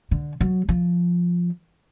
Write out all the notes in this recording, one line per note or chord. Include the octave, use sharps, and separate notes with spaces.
D3
F#3
F3